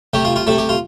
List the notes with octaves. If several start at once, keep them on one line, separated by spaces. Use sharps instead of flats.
C3 A3 G4
F4
F4
C3 A3 A4
G4
F4